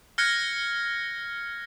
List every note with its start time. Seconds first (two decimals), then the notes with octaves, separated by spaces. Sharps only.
0.18 F6 F#6 G#6 A#6 C#7